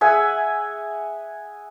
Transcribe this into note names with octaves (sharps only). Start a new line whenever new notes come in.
G#4 E5 F#5 G#5